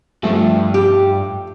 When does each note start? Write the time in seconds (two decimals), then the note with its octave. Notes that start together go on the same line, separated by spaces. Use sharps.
0.23 G2 F3 A3
0.74 G4